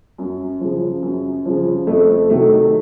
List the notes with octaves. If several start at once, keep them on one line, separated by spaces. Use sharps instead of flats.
F#2
C#3 F3
F#2
C#3 F3
F2 A3
C3 D#3 F#3 A3